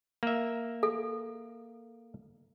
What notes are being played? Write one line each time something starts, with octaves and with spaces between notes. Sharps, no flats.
A#3 E5
A4